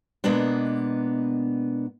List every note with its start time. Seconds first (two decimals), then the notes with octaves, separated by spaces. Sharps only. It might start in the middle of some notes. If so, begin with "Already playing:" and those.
0.24 B2 G#3 A#3 B3 D4